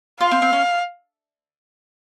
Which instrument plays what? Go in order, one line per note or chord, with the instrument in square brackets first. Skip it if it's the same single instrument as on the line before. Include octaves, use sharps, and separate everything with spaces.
[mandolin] F4 [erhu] F5
[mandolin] C4
C4
C#4